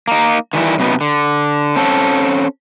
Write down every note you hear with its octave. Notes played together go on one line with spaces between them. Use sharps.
A#3 D#4
D#3 E3 G3 E4
F#2 C3 F#3 B3 D#4
D3
C4 C#4 A4